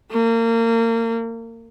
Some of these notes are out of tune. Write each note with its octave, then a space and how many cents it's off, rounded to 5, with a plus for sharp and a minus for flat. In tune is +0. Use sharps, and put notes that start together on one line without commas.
A#3 -30